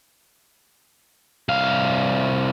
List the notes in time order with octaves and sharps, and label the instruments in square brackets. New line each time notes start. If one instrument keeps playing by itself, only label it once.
[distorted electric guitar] C2 F5